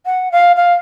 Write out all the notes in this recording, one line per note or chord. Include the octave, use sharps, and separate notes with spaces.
F#5
F5
F5